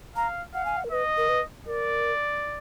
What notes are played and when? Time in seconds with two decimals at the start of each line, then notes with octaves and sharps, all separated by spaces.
0.16 F5 A#5
0.54 F5 F#5
0.65 G#5
0.77 F#5
0.84 A#4
0.91 B4 D#5
1.17 A#4
1.29 B4
1.67 A#4 D5